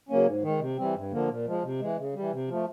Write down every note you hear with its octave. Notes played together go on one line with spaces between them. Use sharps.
C#3 F#3 A#3 C#4
G#2
D#3 G#3
C3
E3 G3 C4
G2
D3 F3 A#3
A#2
F3 G#3
C3
E3 G#3
C#3
G3
E3
C3
F3 A3